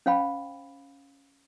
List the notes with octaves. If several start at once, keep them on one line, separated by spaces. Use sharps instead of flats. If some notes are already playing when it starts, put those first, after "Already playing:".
C#4 C5 F5 G5 B5